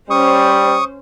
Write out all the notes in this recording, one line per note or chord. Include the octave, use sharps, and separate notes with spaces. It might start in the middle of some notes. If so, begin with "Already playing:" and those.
G3 C#4 C5 C#6 D#6